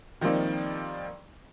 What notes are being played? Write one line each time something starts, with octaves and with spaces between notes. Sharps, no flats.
D#3 F3 G3 A#3 C4 D#4